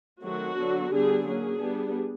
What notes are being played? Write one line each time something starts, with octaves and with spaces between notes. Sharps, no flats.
D#3 F#3 A3 C4 F#4
D3 F#3 B3 D4
D3 G3 B3 D4 G#4
F#3 A#3 C#4 G#4
G3 B3 D4